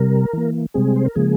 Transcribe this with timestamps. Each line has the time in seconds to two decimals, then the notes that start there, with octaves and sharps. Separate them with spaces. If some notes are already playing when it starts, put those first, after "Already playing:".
Already playing: C3 G3 A#4
0.33 E3 A#3
0.74 C3 G3 G#3 C4 G#4
0.96 C5
1.05 A#4
1.15 C#3 F3 G#3 A#3 G#4